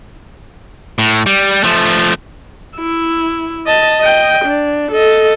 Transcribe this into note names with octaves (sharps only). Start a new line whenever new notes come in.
A2
G3
F3 A3
E4
D#5 A5
D#5 G5
D4
A4 D#5